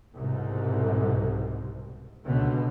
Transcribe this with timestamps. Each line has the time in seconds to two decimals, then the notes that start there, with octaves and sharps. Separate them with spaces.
0.15 C2 G#2 B2
2.26 C#2 B2 D3